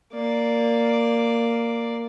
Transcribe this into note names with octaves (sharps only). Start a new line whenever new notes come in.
A#3 D5